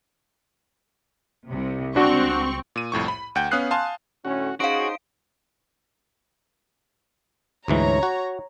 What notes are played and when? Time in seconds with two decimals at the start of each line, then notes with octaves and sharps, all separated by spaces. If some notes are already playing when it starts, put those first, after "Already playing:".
1.49 C2 C3
1.96 C#2 C4 D4 F#4 C#6
2.76 A#2 D#7
2.92 C2 F2 A2 C#6
3.08 B5
3.35 D2 F#5 G5 G6
3.51 B3 C#4 F5 D#6 F#6 C7
3.71 F5 G#5 A5 C6
4.25 A2 D3 C#4 F#4
4.60 C#4 D#4 F#4 G#4 C5 F5 D7
7.68 D2 G#2 E3 C#5 A#5
8.03 F#4